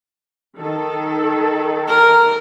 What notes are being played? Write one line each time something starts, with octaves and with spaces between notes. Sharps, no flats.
D#3 A4
A#4